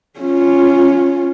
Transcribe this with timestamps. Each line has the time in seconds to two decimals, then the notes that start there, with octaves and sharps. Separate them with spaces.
0.20 C#4 F4